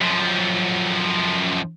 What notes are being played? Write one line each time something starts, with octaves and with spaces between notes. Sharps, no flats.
F#2 F3